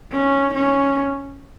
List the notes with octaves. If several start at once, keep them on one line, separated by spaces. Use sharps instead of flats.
C#4
C#4